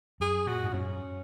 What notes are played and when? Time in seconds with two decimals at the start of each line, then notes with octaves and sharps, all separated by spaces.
0.20 F#2 G#4
0.47 A#2 F#4
0.64 G#2
0.73 F#2 C#4